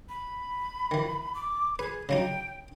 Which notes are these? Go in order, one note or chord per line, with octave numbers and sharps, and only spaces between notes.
B5
D#3 E3
D6
G#4 B4
C#3 F#3 D#4 G5